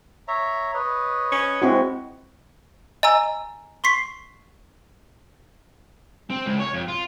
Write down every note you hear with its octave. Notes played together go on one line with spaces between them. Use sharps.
C#5 E5 A#5
B4 C#5 D#5
C#4
G#3 C4 E4 F#4
D#5 G#5 A#5 E6
C6 C#6 B6 C7
C4
C#2
C#5
F2
F4